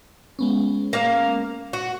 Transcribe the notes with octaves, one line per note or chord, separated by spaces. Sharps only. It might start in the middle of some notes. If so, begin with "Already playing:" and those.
G#3 B3 C#4
A#3 F5
F#4